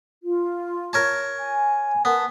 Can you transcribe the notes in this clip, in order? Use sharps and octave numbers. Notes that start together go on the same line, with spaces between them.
F4
A#4 C#5 A5
G#5
B3 A#4 A5